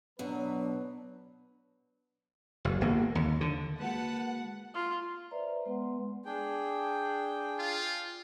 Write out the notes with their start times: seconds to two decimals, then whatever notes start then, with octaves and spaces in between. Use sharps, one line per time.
0.19 B2 F#3 D4 B4
2.65 F#1
2.81 G1 A#3
3.15 D#2
3.41 D3
3.80 G#3 A#3 F#4 B4 F#5 A5
4.74 F4
5.31 B4 C5 D5 E5 A#5
5.66 G#3 B3 B4 F#5 C6
6.25 D4 G#4 G5
7.60 F4